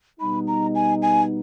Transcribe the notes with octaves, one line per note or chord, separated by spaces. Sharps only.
B2 G3 B3 D#4 B5
A#5
G#5
G#5